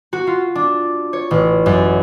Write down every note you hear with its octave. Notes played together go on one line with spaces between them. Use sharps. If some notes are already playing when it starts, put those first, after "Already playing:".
F#4
F4
D4
C#5
A1
F#2